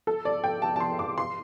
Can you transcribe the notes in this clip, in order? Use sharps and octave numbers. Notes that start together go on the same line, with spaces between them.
A4
D5
G5
A5
A5
C6
D6
C6